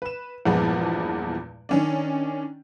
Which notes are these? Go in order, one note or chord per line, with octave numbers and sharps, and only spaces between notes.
B4 E7
E2 G2 A#2 F3 G#3 B3
D#3 C#4 D4